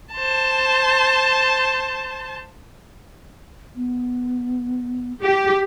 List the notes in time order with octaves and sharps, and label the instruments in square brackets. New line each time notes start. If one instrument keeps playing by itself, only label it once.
[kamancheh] C5 A5
[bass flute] B3
[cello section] G4